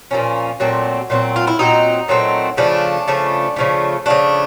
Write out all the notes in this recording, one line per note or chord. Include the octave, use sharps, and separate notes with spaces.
A#2 F3 A#3 C#4
A#2 F#3 A3 C4
A#2 F#3 A3 C4
F4
E4
A#2 F#3 A3 C4 D#4
A#2 F#3 A3 C4
C#3 F3 A3 D4
C#3 F3 A3
C#3 F3 A3
C#3 F3 A3 D4